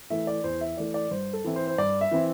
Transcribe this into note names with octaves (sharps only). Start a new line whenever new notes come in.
E3 A3 E5
D5
E2 C5
E5
E3 A3 D5
D5
G2 C5
A4
E3 C4 E4
C5
C5
G2 D5
E5
E3 C4 E4